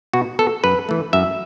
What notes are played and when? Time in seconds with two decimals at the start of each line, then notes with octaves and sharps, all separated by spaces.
0.13 B2 F#4
0.39 B3 A4
0.64 F#2 B4
0.89 E3 A3
1.13 F#2 E5